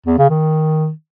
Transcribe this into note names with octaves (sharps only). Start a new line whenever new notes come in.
E2
C#3
D#3